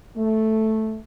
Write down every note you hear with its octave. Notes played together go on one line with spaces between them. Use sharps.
A3